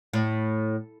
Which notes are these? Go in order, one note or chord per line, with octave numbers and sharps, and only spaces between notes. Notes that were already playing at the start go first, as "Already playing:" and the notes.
A2